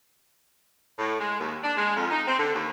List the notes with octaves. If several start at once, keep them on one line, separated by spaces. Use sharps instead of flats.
A2
G#3
D#2
D4
G#3
F2
D#4
C4
D3
D#2